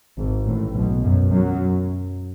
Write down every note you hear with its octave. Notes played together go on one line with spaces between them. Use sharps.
G#1 G#2
A1 A2
B1 B2
F#2 F#3
F#2 F#3